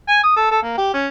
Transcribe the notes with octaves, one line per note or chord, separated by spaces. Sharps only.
G#5
D#6
A4
A4
A#3
G4
C#4